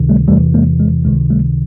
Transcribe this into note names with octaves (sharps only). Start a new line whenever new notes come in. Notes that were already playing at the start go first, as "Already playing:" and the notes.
Already playing: C#2 C3 D#3
G3 A3
E2 C3 E3 G3 A3
G#3 A#3
G#3
C#2 C3 D#3 G#3
G3 A3